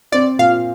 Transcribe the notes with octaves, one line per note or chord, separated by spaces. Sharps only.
C4 D5
A#2 F5